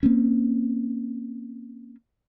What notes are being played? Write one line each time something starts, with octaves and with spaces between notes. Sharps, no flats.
A#3 C4 C#4